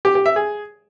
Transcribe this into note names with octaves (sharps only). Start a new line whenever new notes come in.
G4
G4
E5
G#4